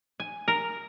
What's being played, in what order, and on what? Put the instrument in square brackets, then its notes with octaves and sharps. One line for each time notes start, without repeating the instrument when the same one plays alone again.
[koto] G#5
A#4